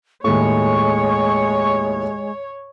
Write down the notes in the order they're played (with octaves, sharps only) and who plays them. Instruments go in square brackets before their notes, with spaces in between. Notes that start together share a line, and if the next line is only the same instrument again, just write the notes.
[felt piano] D#2 A2 [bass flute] G#3 [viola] C#5 [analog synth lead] C#6